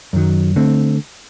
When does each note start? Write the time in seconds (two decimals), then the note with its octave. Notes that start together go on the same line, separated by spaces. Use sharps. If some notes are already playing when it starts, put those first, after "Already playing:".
0.13 F#2 D#3 F#3
0.56 D3 A3 C4